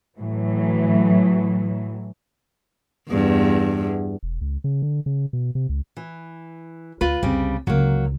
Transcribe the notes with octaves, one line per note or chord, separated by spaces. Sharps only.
A2 E3 F#3
E2 G2
E1
C#2
C#3
D3
C#3
B2
C3
C#2
E3
D2 F4 B4
C2 F2 C#3 G3 C4
C#2 D3 F#3 A#3